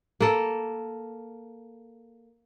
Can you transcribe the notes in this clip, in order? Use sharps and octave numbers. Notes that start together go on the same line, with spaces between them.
A#3 A4